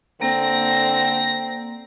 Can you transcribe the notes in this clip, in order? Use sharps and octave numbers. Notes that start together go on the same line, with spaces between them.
D3 A#3 C4 A#6